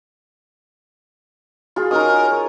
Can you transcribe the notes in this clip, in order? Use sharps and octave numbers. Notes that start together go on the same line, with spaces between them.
F4 F#4 G#4
C#4 D#4 A#4 D#5
C#5